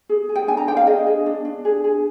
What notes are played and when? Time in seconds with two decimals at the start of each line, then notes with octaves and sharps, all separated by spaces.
0.09 G#4
0.29 G#4
0.36 G5
0.47 D4 G#5
0.57 A#5
0.68 D4 G5
0.77 F5
0.86 G#4 D#5
1.06 G#4
1.26 D4
1.45 D4
1.65 G#4
1.84 G#4